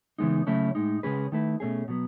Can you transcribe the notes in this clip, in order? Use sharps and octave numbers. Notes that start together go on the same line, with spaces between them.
C#3 E3 G#3 B3 D#4
C#3 F#3 A3 C#4 E4
A2 G#3 D#4
C#3 G#3 C#4 G#4 B4
D#3 A3 E4 B4
B2 A3 C#4 G#4
B2 F#3 B3